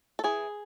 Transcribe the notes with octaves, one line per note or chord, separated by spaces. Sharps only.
A4
E3 G#4